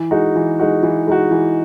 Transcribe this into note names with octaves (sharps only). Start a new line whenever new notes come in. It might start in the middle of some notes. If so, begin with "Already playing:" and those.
Already playing: E3
G#3 D#4 F#4
E3
G#3 D#4 F#4
E3
G#3 D#4 F#4
E3